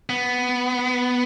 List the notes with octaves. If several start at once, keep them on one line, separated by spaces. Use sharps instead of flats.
B3